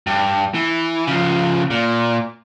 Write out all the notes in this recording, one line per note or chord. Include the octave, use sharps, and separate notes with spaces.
G2
E3
C#3 F3
A#2